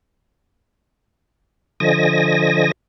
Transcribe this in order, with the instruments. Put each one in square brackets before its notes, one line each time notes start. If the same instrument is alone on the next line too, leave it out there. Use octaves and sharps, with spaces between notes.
[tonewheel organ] D3 F3 D#5 G#5 A#6